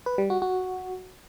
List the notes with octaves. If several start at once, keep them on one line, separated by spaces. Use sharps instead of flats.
B4
G3
F#4
F#4